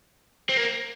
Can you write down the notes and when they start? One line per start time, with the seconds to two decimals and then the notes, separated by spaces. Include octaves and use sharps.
0.49 C4
0.57 A#3